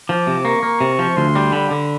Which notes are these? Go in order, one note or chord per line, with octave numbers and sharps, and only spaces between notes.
F3 D6
C3
A#3 C#6
A#3
C3
F3
D2 C6
G3
D3 B5
D3